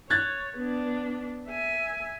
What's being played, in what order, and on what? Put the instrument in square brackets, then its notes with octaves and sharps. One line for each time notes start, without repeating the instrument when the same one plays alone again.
[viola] C#5 [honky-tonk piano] F#6 G#6 A6
[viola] B3 D4
E5 G#5